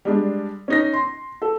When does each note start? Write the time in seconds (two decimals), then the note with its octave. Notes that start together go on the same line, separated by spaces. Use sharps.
0.05 G3 G#3 D4
0.68 C#4 D#4 A#6
0.93 C6
1.42 A4